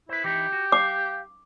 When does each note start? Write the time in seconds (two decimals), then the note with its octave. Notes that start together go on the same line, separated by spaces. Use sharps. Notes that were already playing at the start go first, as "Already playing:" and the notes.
0.09 E4 B4 C5
0.24 E3 D#4 E4 G4
0.52 F#4
0.72 F5 D6